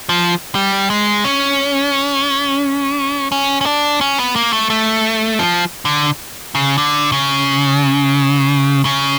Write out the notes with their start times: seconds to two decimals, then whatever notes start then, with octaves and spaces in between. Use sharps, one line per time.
0.09 F3
0.55 G3
0.90 G#3
1.24 C#4
3.32 C#4
3.61 C#4
3.66 D4
4.01 C#4
4.18 B3
4.36 A#3
4.53 A3
4.70 A3
5.39 F3
5.85 D3
6.55 C#3
6.78 D3
7.12 C#3
8.85 C#3